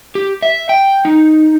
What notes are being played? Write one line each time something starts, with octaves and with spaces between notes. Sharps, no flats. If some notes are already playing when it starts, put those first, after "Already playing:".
G4
E5
G5
D#4